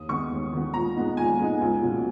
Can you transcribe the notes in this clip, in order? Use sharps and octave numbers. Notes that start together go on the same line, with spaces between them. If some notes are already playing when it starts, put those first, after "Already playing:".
Already playing: D#2 D#6
D#3 G#3 B3 C#6
D#2
D#3 G#3 B3
A#2 A#5
G#3 B3 D#4
A#2 G#5
G#3 B3 D#4
C#2
B2 F#3 A#3